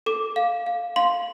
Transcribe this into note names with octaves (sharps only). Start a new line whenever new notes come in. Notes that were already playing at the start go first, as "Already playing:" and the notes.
A4 D6
F5
F5
F5 C6